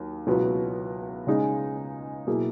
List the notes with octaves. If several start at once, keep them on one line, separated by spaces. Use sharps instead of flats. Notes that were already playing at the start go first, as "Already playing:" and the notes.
Already playing: D#2 F#3
C#2 B2 F#3 B3 E4
C#3 G#3 D#4 G#4
B2 F#3 A#3 E4 G#4